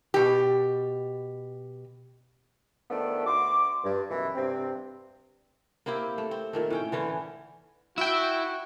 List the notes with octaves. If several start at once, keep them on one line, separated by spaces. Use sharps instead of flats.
B2 G4
D#3 F3 A3 B3 D4
D2 F#4 C6 D6
G2
F#2 B2 E3
G2 C3 C4
A#3 C4 E4 G4
A3
C4
A#2 D#3 A3
A2 C#4 G5
D3 E3 C#4
E4 F#4 G5 E6